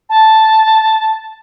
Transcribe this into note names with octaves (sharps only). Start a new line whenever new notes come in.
A5